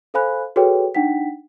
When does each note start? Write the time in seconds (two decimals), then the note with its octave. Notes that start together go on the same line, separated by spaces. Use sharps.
0.14 A4 C5 F5 G#5 B5 F#6
0.56 F#4 G#4 A4 B4 C#5 G5
0.95 D4 D#4 F#5 G5 B6